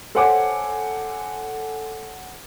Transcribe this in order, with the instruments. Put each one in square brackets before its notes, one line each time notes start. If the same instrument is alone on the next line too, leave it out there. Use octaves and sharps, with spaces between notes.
[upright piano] A4 C5 C#5 F#5 G#5 D6